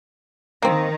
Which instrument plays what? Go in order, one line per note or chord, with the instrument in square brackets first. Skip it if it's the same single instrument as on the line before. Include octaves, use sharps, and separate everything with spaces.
[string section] D#3 [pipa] A#3 C4